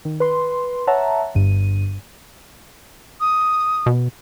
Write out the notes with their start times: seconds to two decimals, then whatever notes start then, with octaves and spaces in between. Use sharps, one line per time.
0.05 D#3
0.20 B4 C6
0.87 C#5 E5 F#5 A5 A#5
1.35 G1 G2 D#7
3.21 D#6
3.86 B2